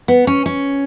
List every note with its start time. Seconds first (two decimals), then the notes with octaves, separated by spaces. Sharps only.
0.08 B3
0.27 C#4
0.46 C#4